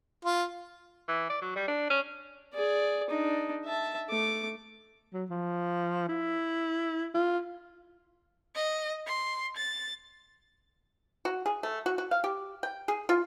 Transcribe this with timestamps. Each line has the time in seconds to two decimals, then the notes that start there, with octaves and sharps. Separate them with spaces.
0.25 F4
1.08 E3
1.30 D5
1.42 F#3
1.56 G3
1.68 D4
1.90 C#4
2.54 G#4 D5
3.10 D4 D#4
3.65 E5 A5
4.09 A3 D6
5.13 F#3
5.30 F3
6.09 E4
7.14 F4
8.55 D#5
9.07 C6
9.57 A6
11.25 F#4
11.46 G#4
11.63 A3
11.86 F#4
11.98 F#4
12.11 F5
12.24 G4
12.63 G5
12.88 G#4
13.09 F4